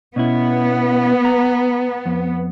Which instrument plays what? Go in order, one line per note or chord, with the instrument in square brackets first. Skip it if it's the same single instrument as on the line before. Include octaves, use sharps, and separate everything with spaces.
[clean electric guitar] B2 C#4 E4 [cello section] B3
[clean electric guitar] A#5
F2